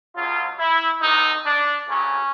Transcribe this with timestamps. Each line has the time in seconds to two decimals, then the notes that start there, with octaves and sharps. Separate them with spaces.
0.16 C#2 C#3 F#3 F4
0.59 E4
1.02 C2 C3 D#3 D#4
1.45 D4
1.88 D2 C#3 F#3 C#4